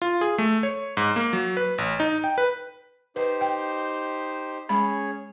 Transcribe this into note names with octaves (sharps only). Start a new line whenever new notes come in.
F4
G#4
A3
C#5
G#2
A#3
F#3
B4
A1
D#4
G5
B4
D#4 G4 B4 C5
G5
G#3 C#4 G#4 C#5 B5